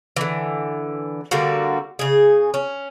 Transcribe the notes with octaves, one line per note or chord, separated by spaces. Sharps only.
D3 E3
D3 G3 A#3 F#4
C#3 G#4
C#4